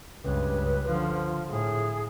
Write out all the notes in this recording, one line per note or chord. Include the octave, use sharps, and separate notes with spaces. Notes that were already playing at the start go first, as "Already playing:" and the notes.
C#2 G2 B4
D3 F3 F4
A2 G#4